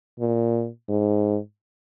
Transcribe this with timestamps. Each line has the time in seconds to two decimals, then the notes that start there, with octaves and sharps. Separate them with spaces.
0.20 A#2
0.90 G#2